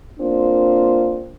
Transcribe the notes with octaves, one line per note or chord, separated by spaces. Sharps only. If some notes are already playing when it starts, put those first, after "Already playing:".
A#3 C4 D4 F4